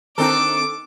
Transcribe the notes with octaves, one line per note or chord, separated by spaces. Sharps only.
D#3 C4 D4 D#4 A4 D6